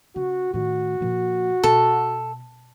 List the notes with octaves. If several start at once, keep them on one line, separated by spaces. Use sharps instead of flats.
C#3 F#4
A2 D#3 F#4
A#2 F3
B2 A4